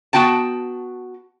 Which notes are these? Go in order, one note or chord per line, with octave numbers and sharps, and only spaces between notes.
B3 F#4 G5 A5